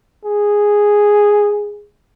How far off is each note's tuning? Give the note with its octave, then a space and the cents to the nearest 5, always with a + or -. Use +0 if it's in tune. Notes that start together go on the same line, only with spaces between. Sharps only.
G#4 -5